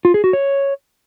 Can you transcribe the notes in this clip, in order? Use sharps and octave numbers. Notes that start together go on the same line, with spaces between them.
F4
G#4
F#4
C#5